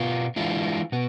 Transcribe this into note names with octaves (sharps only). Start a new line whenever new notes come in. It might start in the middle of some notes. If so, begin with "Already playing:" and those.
Already playing: B2 B3 F4
E3 G#3 D4 F4
B2 B3